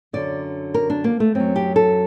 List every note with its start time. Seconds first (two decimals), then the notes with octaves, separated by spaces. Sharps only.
0.13 F#2 D3 F#3 D5
0.74 A#4
0.90 D4
1.04 A#3
1.20 A3
1.35 F#2 F#3 C4
1.56 G4
1.76 A4